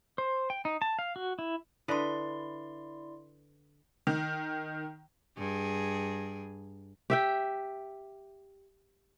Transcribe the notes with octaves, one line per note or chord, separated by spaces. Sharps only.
C5
G5
D#4
A5
F5
F#4
E4
D3 E4 B4 D5 D#5 C6
D#3
G2 G#4
G4 E5 G5